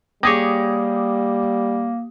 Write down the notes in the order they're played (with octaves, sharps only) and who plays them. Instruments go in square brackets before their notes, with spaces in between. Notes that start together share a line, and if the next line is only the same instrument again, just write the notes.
[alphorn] G3 [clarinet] A#3 [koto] G4 G#4 C#5 [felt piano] D6 D#6 A#6